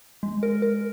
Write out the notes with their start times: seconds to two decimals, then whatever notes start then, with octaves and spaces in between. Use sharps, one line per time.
0.23 G#3
0.43 A#4
0.62 A#4